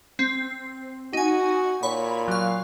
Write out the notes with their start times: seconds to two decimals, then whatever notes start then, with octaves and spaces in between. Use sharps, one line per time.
0.19 C4
1.13 D#4 F#4 G#5
1.83 A#2 C#5 B5
2.28 F#3 F5